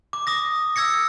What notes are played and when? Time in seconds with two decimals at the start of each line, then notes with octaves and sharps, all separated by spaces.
0.13 D6
0.27 D6 D#6 A#6
0.76 E6 G#6 A#6 C#7